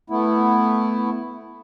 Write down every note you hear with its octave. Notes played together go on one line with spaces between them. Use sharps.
A3 B3 E4